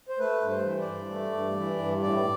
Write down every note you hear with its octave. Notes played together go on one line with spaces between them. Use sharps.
C5
A3 B4
G2
C5
E3
D5
G2
A3
G2
E3
G2
A2 D5